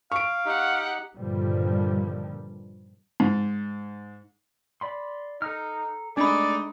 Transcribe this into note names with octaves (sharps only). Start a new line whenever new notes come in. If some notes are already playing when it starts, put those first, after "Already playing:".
F5 C#6 D7
D#4 G4 F#5
G2 A#2 D3 D#3 F3 G3
G#2
D5 B5 C6
D#4 A4 A#5 F6
G#3 A3 D4 D#4 D5 B5